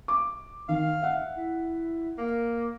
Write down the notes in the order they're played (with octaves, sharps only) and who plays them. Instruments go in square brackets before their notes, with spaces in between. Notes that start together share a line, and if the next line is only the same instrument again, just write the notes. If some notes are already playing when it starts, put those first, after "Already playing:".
[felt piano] D6
[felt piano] D#3 [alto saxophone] F5
[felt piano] E5 F#5
[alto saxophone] E4
A#3